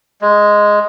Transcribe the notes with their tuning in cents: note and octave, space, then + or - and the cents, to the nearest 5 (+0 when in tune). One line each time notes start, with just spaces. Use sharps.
G#3 +0